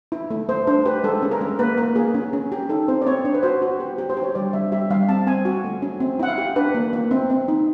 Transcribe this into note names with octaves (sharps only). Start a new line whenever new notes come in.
E4
A3
A3 C5
D4 C5
G4 B4
G#3 A4
C#4
A#4
G#3
A#3 B4
A#3 A#4
A#3 G#4
C#4
C#4
G4
D#4 A4
C4 C5
D5
C4 C#5
D4 C5
B4
F#4 C5
F#4
G4
G4
C5
G4
C#5
G3 D5
G3 E5
G4 E5
G3 F5
C4 A5
C4 G#5
F#4
A3
C#4
C4
E4 F#5
F5
G4
D4 B4
A#3
A#3
C4
C4
D#4